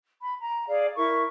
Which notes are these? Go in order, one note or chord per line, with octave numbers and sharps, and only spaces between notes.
B5
A#5
G#4 D5 F5
E4 A#4 C#6